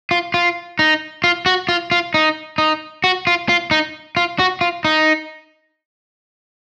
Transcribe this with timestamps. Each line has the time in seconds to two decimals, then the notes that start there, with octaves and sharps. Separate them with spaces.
0.11 F4
0.34 F4
0.79 D#4
1.24 F4
1.46 F#4
1.69 F4
1.91 F4
2.14 D#4
2.58 D#4
3.04 F#4
3.27 F4
3.49 F4
3.71 D#4
4.17 F4
4.39 F#4
4.61 F4
4.85 D#4